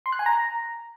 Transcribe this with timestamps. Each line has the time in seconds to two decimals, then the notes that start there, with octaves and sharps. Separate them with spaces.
0.06 C6
0.12 F#6
0.19 G#5
0.26 A#5